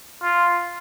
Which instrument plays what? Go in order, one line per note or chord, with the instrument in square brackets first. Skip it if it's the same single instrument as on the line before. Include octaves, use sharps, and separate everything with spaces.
[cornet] F4